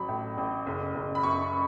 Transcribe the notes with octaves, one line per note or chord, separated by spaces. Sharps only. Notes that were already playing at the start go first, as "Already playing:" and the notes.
Already playing: A1 F#3 B5
A2
A1
F#1
F#1
B5
F#2 C#6